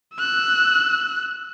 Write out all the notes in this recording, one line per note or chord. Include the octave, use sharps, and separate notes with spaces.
E6 F#6